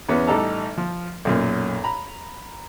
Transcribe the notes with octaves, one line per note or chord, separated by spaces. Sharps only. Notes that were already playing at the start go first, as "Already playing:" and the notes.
E2 B3 C#4
A1 G3 D#4 G4 A4 A#5
F3
B1 F#2 A#2
A#5 B5